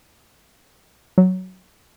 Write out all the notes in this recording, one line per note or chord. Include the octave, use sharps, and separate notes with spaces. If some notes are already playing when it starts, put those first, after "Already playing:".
F#3